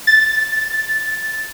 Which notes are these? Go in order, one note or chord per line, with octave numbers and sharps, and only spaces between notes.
A6